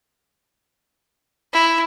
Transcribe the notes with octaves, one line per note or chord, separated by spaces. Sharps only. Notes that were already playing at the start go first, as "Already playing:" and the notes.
E4